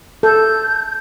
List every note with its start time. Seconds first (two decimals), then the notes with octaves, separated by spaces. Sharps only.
0.23 A4 G6